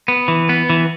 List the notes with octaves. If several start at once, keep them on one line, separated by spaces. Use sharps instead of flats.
B3
E3
B3
E3